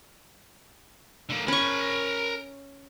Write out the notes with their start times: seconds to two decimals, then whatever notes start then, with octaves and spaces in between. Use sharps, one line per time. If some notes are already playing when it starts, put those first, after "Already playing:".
1.30 D3 A#3
1.48 C#4 A#4 B5 C#6